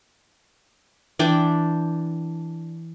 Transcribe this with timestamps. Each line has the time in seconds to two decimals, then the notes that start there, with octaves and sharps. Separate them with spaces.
1.19 E3 D4 G5